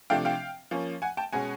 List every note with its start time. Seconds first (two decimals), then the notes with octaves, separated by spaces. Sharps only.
0.10 C3 F3 A3 D4 F5 G5
0.25 F5 G5
0.71 F3 A#3 C#4
1.02 F#5 G#5
1.17 G5 A5
1.33 B2 G#3 C#4 F#5 G#5